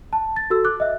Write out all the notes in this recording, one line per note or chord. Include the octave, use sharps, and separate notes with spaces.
A5
A6
F#4 A4 E6
D6 F#6
D#5 E5